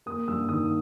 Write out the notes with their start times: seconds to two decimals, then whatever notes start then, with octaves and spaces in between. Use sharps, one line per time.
0.06 A#3 D#6
0.28 G2 E6
0.49 D#3 D#6